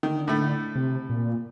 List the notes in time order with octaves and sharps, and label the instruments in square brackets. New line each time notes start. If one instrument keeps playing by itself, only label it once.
[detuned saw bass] D3 [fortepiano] D#3
[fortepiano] A2 A3
[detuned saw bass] C3
A#2